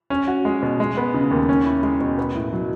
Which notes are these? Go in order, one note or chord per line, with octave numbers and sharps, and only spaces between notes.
C#4
F#4
G#3
B2
G#3
B3
C#3
D#2
C#4
E4
G#3
B2
B3
A2
F#3